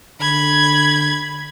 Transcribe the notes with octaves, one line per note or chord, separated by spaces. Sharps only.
D3 B5 G#6